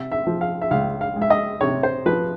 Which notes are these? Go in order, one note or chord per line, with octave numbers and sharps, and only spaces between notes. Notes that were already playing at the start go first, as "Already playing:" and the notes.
Already playing: C3 E5
E5
F3
F5
E5
C#2 F5
F5
G#3
E5
D#5
C3 C#5
C5
F3 B4